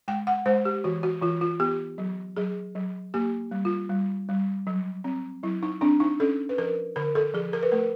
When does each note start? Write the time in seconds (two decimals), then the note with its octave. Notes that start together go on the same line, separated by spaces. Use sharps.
0.08 G#3 G5
0.27 F#5
0.46 G#3 C5
0.65 G4
0.84 E3 F#4
1.03 F#4
1.22 E3 F4
1.41 F4
1.60 B3 G4
1.98 F#3
2.37 F#3 G#4
2.75 F#3
3.14 A#3 G4
3.51 G3
3.65 F4
3.90 G3
4.29 G3
4.67 F#3
5.04 C4
5.43 F#3 E4
5.63 D#4
5.81 C4 D4
6.00 D#4
6.20 C#4 A4
6.49 B4
6.58 F3 A#4
6.96 D3 A#4
7.15 A4
7.34 F3 G#4
7.53 A#4
7.63 B4
7.72 A3 A#4